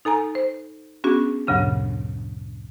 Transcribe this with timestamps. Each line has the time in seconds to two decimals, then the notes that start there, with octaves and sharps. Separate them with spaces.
0.05 D#4 A4 G#5 A#5
0.35 C5
1.04 B3 C#4 D4 F#4 G#4
1.47 D2 G2 A#2 C#3 F#3 D4